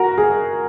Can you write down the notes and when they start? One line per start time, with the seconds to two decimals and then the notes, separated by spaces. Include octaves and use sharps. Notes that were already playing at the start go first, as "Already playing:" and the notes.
Already playing: F#4 A#4
0.18 G#4